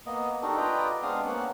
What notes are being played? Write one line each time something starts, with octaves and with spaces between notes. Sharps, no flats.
A#3 B3 D#5
D4 D#4 F#4 G4 A4 A#4
F4 B4 D5 D#5 G5 A#5
G#3 B3 C4 D4 F5 D#6
A#3 B3 C#4 F#5